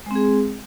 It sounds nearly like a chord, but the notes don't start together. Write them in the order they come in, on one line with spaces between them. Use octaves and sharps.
G#3 C4 G#4